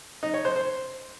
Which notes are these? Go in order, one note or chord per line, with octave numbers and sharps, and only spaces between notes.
D#4
C#5
C5
C5